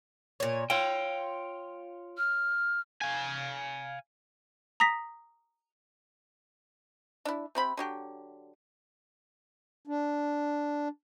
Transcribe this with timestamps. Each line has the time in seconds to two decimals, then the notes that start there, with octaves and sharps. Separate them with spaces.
0.40 A#2 C#5
0.70 F4 C#5 G5
2.18 F6
3.02 F5 G#5
4.80 A#5 D#6 A#6 B6
7.25 D4 E4
7.55 C3 C4 B5
7.77 D3 F#3 G4
9.87 D4